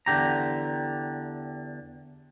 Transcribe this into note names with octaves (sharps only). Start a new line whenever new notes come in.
E2 D3 G4 A#5